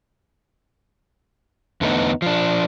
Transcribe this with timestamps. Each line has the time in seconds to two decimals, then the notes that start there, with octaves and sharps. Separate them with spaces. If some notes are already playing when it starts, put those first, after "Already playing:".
1.81 E2 D3 A3 B3 D#4
2.22 F3 D4